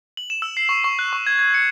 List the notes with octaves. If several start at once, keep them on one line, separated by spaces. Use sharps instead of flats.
F#7
E7
E6
C7
C#6
C#6
F#6
C#6
G#6
G#6
C#7